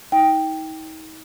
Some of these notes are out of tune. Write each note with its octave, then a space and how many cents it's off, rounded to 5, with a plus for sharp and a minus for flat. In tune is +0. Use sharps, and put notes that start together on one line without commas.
D#4 +35 G5 +0